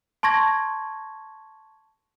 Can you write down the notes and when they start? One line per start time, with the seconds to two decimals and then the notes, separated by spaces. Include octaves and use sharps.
0.23 A5 C6 C#6 G#6 A#6